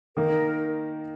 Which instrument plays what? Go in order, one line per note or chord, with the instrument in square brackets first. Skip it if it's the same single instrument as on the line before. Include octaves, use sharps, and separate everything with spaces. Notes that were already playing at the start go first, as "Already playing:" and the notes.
[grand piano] D#3 A#3 D#4 [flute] A#4